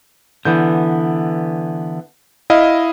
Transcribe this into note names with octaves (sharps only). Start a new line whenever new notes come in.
D3 E3 B3 G6
E4 D#5 F5